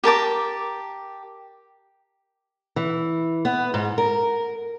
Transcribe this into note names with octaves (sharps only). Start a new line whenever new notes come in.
G4 A#4 A5 D6
E3
B3
G#2
A#4